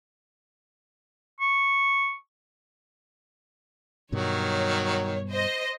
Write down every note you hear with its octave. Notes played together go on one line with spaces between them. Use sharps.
C#6
G2 B2 D#3 F#3 G3 C#5
C5 D#5